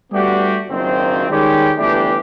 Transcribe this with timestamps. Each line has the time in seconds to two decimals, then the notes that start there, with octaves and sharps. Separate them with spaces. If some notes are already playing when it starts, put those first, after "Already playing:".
0.12 G3 A3 B3 D4 F#4 G4
0.70 F#1 F#2 A#2 D#3 C4
1.30 D#3 G3 G#3 C#4 G4
1.78 G1 E3 A3 D4 G4